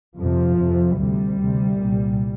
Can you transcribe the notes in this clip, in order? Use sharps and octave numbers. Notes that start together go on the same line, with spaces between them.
F2 C3 F3
F2 C3
D2 C3 G3
D2 C3
C2 A#2